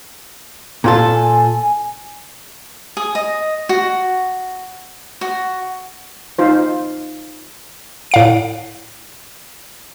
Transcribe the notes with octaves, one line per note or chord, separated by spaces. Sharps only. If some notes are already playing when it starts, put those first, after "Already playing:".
A#2 F4 A4
G#5
G#4
D#5
F#4
F#4
D#4 F4 C5
A2 F5 D7